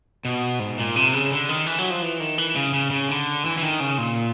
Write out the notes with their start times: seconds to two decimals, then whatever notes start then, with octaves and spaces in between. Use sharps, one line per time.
0.25 B2
0.60 G#2
0.78 A#2
0.96 C3
1.13 C#3
1.31 D3
1.49 D#3
1.67 E3
1.78 F#3
1.90 F3
2.02 E3
2.20 D#3
2.38 E3
2.56 C#3
2.74 C#3
2.91 C#3
3.09 D3
3.45 E3
3.58 E3
3.63 D#3
3.80 C#3
3.98 A#2